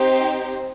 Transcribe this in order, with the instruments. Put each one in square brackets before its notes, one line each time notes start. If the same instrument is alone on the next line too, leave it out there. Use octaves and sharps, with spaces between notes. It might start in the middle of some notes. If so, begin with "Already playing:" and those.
Already playing: [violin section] C4 D#4 G4 C5